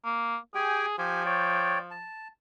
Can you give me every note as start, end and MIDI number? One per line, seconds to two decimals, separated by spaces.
0.05 0.37 58
0.55 0.86 67
0.55 0.97 68
0.55 0.86 79
0.55 0.86 80
0.98 2.07 53
0.98 1.23 67
0.98 1.23 80
1.26 1.78 73
1.26 1.78 74
1.26 1.78 79
1.91 2.28 81